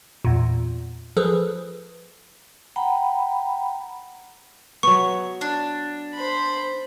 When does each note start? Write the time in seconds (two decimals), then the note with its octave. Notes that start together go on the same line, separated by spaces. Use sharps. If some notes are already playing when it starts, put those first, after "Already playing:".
0.25 E2 A#2
1.17 F3 G#4 A4 B4
2.76 F#5 G5 A#5 B5
4.83 F#3 B3 C#6
5.41 D4
6.14 C5 B5